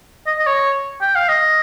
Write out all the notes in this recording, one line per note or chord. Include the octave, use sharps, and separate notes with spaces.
D#5
D#5
C#5
G5
F5
D#5